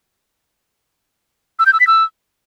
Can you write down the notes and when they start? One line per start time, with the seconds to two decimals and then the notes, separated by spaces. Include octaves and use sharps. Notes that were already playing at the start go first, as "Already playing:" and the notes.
1.59 E6
1.66 G6
1.73 E6
1.80 B6
1.87 E6